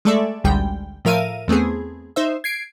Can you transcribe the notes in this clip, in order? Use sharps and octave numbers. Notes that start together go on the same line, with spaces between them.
G#3 A3 A4 D5 E5
A1 D2 D3 G3 G#3 G5
A2 F3 A#4 E5 F5 D#7
E2 A3 B3 C4 G#4
D#4 C5 E5
G#6 C7 D7